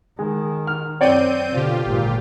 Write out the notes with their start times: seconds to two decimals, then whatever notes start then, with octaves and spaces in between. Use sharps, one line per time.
0.19 D#3 G#3
0.67 F6
1.01 F#2 C4 C#5 D5 G5 G6 D#7
1.53 B2 D3 F4 G4
1.87 G#1 A#2